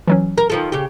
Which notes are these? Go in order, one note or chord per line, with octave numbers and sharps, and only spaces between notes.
E3 F#3 C#4
A#4
D#3 F3 A4
C#3 G4